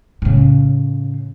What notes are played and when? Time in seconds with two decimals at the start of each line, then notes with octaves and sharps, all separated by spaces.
0.22 A2 C#3